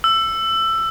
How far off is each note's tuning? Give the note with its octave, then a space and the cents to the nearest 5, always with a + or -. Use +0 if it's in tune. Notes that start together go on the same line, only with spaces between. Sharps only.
E6 +15